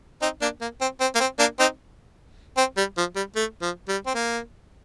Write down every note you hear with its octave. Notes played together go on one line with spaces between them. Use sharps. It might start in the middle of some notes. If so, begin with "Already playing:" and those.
C4 D#4
A#3 D4
A#3
C4
C4
A#3
C4
A#3 D4
C4 D#4
C4
G3
F3
G3
A3
F3
G3
C4
A#3